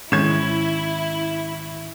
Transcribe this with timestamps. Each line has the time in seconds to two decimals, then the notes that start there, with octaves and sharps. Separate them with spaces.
0.12 G#2 D#3 C#4 E4 G#6 E7